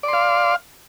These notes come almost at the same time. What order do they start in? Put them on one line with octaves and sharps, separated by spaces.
D5 C6 F5